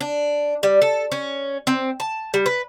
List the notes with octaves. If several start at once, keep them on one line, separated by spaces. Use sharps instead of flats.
D4
G3
A4
C#4
C4
A5
G3
B4